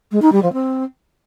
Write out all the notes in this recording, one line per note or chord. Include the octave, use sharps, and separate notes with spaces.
G#3
D#4
G3
F3
C4